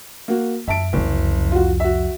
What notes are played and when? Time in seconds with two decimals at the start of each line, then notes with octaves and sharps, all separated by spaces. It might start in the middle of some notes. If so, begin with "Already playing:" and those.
0.28 A#3 F#4
0.68 F#2 E5 A5 D7
0.93 F#1 C2 F2
1.52 F4 F#4
1.80 F#4 E5